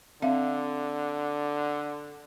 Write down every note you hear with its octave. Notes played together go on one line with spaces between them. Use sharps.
D3 C4 E5 F5